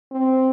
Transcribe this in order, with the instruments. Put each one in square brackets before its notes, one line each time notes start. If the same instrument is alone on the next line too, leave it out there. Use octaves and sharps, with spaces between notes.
[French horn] C4